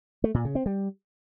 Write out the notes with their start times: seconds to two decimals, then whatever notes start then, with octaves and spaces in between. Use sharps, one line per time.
0.24 A3
0.34 A#2
0.45 C#3
0.55 C4
0.66 G3